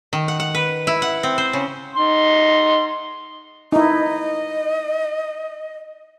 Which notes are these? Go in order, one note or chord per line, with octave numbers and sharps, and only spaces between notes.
D#3
F#5
F#5
B4
E4
F#5
C4
C5
C#3
D#4 C6
D#4 E4 D#5